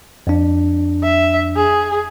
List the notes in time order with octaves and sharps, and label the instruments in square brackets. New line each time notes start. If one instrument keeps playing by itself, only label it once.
[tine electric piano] F2 D4
[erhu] E5
G#4